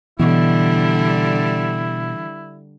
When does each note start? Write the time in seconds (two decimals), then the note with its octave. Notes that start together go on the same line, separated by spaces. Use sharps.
0.19 B2 D3 E3 G3 E4